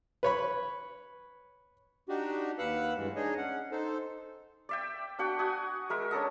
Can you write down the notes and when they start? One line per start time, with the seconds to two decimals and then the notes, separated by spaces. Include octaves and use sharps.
0.23 B4 C#5 B5
2.09 D4 D#4 F#4 G4
2.59 D#2 B4 F5 F#5 E6 F#6
2.96 G2 E3 G#3
3.16 D4 D#4 G#4 C#5 D#5
3.38 C#4 F#5
3.72 D#4 A4 C5
4.69 D5 E5 G5
5.19 D4 F#4 F#5 G5
5.39 F#4 G#5 D#6
5.90 G#3 A#4 E5
6.11 C#4 D4 A4 D#5